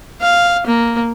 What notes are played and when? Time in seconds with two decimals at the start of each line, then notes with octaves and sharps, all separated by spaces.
0.21 F5
0.66 A#3